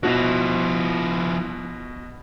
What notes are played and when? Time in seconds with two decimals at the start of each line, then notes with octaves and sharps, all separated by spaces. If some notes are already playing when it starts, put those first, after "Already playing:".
0.03 B2 F3 E4 F#4